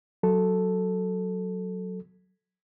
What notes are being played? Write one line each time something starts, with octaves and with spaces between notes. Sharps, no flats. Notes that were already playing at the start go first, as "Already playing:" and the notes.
F#3 A4